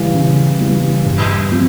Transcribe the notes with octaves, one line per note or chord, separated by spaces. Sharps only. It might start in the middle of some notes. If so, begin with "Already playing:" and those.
Already playing: C#3 E3 G3
C#3
E3 G3
G2
F3 C4